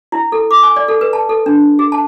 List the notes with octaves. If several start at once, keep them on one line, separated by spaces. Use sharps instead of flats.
E4
A4
D6
G#5
D5
A4
B4
A5
A4
D4
G#4
A5